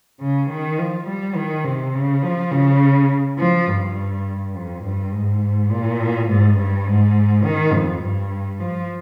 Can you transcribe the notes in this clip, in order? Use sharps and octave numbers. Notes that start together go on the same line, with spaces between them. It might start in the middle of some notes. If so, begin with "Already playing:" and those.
C#3
D#3
F3
G3
D#3
C3
C#3
F3
C#3
F3
G2
F2
G2
G#2
A#2
G#2
G2
G#2
D#3
F2
G2
F3